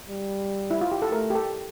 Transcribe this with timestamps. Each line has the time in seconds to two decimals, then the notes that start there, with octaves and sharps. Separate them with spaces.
0.08 G3
0.71 E4
0.81 F4
0.92 G4
1.02 A4
1.12 A3 A#4
1.30 G4
1.35 A4